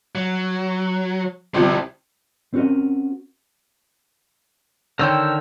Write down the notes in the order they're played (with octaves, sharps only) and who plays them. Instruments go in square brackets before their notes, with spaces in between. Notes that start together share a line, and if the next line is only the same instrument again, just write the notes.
[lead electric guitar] F#3
[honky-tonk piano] G1 C3 F3 [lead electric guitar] C4 E4
[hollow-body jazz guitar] C4 C#4 F#4 A#4 D#5
[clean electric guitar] D3 D#3 [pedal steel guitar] A#4 E6 [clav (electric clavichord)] C5 C#5 G5